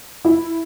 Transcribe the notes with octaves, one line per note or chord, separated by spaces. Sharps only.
E4